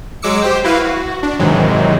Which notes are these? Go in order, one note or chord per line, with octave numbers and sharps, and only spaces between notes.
F#3 G#3 D6 E6 C#7
G4 C5 G5
E4 F#4 B4 F5
F#4
D4
G#2 C3 D#3 E3 F#3 G#3